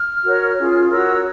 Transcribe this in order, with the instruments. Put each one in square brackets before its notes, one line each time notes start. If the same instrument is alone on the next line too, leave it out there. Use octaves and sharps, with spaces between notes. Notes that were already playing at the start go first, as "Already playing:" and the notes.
Already playing: [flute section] F6
F#4 A#4 C#5
C#4 F4 G#4
F#4 A#4 C#5 E6